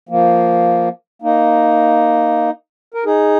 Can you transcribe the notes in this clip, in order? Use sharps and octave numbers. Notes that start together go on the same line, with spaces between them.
F3 A#3
A#3 D#4
A#4
D#4 G#4